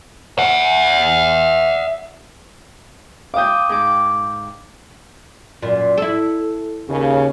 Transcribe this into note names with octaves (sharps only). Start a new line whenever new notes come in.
E5 F#5
F5 G5 D6 D#6 G6
G#2 D6
F#2 A#2
E4 A4
D#2 C#3